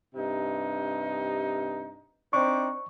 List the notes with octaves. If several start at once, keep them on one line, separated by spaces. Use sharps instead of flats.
G2 C3 D#4
C4 D4 D#4 C#6